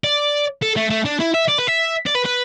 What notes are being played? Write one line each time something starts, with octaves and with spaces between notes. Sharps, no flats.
D5
A4
A3
A3
D4
E4
E5
D5
B4
E5
D5
B4
B4